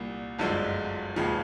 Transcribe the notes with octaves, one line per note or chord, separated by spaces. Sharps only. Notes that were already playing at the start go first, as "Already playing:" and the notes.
Already playing: C2 A#2 G3
G1 F#2 D3 F3 G#3
E1 D#2 C#3 F3 G#3